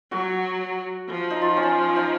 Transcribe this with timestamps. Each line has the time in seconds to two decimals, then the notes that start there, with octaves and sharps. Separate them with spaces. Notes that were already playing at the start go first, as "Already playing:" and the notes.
0.11 F#3 F#4
1.09 F3
1.30 D#4
1.42 F4
1.57 C#4
1.63 D#4
1.96 D#4